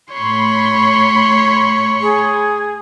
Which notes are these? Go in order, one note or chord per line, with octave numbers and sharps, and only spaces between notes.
A2 C#5 B5 C6
G#4